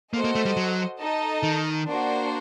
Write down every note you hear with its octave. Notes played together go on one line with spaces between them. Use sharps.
A#3 F#4 A4 C5 D#5
A#3
A3
G3
F#3
D#4 A4 D#5 A5
D#3
A#3 D4 F#4 C5